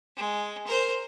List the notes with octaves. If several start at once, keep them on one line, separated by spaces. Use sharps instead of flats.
G#3
A#4 C5